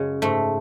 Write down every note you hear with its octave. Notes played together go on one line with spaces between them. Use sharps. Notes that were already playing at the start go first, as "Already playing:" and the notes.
Already playing: F#2 C#3 G#3
G#2 A3